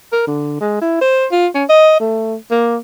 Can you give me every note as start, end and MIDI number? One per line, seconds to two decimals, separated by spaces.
0.12 0.23 70
0.27 0.59 50
0.60 0.80 56
0.81 1.00 64
1.01 1.26 72
1.32 1.47 65
1.54 1.64 61
1.69 1.99 75
2.00 2.35 57
2.51 2.78 58